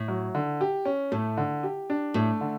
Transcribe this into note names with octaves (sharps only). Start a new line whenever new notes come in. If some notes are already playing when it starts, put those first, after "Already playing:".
Already playing: A2
F#3
D3
G4
C#4
A2 A3
D3
G4
D4
A2 A3
D3